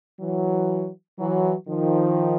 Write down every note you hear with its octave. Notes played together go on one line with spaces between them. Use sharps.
E3 F#3
E3 F#3
D#3 F3